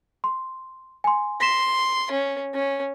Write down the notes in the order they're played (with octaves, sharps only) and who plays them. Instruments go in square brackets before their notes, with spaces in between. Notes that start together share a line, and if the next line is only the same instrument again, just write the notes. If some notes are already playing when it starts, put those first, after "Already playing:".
[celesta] C6
G#5 C6
[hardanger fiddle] C6 [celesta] A#6 B6 E7
[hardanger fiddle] C#4
C#4